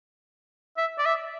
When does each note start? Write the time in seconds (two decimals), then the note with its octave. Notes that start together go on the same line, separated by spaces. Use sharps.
0.77 E5
0.98 D5
1.05 E5